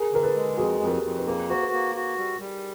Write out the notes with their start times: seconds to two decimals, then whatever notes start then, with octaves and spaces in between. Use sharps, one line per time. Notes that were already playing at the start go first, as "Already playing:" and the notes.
Already playing: G#4 A#4
0.12 D3 A#4
0.23 A4 B4
0.35 G#3
0.57 F2 F#4 G#4
0.81 F2
0.88 A#4
0.92 G4 A4
1.03 F2
1.17 B4
1.26 A#3 G#4 A#4
1.49 F#4 C5
1.61 A4 B4
1.73 A#3
1.95 F#4
2.18 G3
2.40 G3